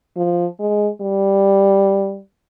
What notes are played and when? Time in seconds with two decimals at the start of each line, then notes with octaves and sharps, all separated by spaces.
0.17 F3
0.59 G#3
1.01 G3